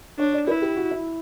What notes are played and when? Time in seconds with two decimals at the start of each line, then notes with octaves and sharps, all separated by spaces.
0.19 D4 C#5
0.33 D5
0.48 E4 B4
0.62 G4
0.76 F#4
0.91 E4